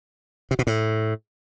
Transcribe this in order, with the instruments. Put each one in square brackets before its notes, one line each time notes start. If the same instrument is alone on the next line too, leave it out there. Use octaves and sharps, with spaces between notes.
[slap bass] C3
B2
A2